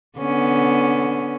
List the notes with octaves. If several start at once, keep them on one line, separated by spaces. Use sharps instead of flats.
D3 B3 C#4